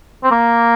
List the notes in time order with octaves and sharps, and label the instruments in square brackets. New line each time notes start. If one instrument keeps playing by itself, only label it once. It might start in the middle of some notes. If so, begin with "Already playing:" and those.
[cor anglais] C4
A#3